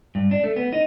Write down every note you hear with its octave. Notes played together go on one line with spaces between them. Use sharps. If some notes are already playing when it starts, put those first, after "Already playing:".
G2
D4
A3
B3
D#4